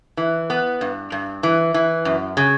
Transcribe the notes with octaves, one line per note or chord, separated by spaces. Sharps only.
E3
B3
G2
G2
E3
E3
F#2
C#3